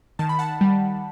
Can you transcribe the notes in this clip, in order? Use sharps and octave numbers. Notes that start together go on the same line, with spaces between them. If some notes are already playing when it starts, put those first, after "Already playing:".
D#3 A5
B5
F#5 A5
G3